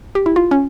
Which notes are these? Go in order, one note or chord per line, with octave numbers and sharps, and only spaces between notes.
G4
E4
F4
C#4